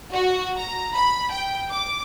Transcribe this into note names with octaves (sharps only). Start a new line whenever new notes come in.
F#4
A#5
B5
G5
D6